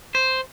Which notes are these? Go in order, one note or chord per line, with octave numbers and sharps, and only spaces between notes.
C5